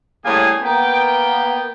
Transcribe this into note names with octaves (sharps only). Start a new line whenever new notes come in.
A2 C#3 G3 A#3 G#4 G#5
A#3 B3 G5